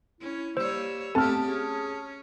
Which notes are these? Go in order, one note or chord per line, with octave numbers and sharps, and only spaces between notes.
C#4 E4
G3 A#3 C5 C#5 E6
A3 B3 C4 G4 A4 A5 F6
C#4 G#4